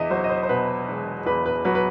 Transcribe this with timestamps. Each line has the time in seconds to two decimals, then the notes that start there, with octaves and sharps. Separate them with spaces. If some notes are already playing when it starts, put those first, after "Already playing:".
Already playing: E2 D#5 E5
0.10 F#3 C5
0.24 D#5
0.29 C5
0.43 C5
0.49 B2 B4
0.88 E1
1.26 E2 B4
1.46 B4
1.65 F#3 B4
1.75 B4